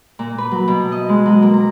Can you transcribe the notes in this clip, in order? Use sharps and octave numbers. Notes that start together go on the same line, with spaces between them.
A#2
B4
F#3
B2
D#5
G#3
F#3
A#3
A#5